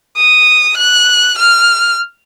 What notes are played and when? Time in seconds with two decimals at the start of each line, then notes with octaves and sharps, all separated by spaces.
0.18 D#6
0.78 F#6
1.38 F6